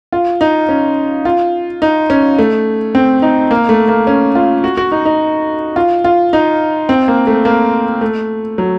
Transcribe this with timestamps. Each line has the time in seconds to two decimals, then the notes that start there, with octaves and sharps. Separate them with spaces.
0.12 F4
0.41 D#4
0.69 C#4
1.25 F4
1.82 D#4
2.10 C#4
2.38 A3
2.95 C4
3.22 D#4
3.51 A#3
3.69 A3
3.88 A#3
4.07 C#4
4.35 F4
4.64 F#4
4.77 F#4
4.92 D#4
5.05 D#4
5.76 F4
6.04 F4
6.33 D#4
6.89 C4
7.08 A#3
7.27 A3
7.45 A#3
8.01 A3
8.58 F#3